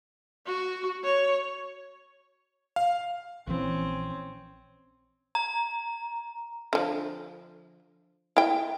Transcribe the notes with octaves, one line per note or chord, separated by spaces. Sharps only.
F#4
C#5
F5
A#1 E3 C4 C#4
A#5
D3 F3
E4 G5